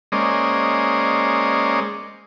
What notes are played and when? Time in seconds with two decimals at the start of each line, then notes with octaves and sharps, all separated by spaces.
0.12 G#3 A#3 C#4 C5 D5 D#5